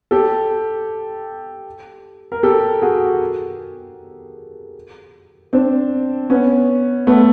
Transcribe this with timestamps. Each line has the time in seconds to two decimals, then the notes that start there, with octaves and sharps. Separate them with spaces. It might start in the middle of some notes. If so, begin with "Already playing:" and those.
0.11 G4 A4
2.32 A#4
2.43 G4 A4
2.82 F#4 G#4
5.53 C4 D4
6.30 B3 C#4
7.07 A3 B3